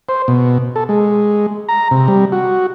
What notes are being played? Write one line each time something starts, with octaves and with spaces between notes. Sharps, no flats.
C5
B2
A4
G#3
A#5
C3
G3
F#4